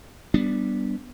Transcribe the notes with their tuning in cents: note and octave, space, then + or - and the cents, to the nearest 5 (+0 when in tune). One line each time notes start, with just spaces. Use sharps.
G3 +0 B3 +0 D4 +0